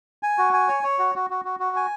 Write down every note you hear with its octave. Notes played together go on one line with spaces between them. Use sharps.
G#5
F#4
G#5
C#5
C#5
F#4
F#4
F#4
F#4
F#4
G#5